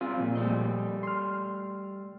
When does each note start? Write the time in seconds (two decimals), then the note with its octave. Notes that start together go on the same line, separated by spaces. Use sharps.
0.01 G3 C4 F4 G#4
0.17 A#2 F3
0.35 G3 A3 D#5
1.03 C6 F6